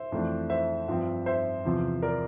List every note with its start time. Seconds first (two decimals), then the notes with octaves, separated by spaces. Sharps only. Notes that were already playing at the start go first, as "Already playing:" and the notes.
Already playing: C5 E5
0.12 F2 E3 A3 D4
0.50 C5 E5
0.88 G2 F3 C4
1.26 C5 E5
1.65 E2 C3 F3
2.02 A#4 D5